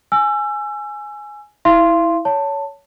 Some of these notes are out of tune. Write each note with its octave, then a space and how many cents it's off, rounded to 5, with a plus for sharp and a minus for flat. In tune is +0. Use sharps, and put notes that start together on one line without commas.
G#5 +5 E6 +30
E4 -15 F5 -40 C6 +0
C#5 +20 A5 +15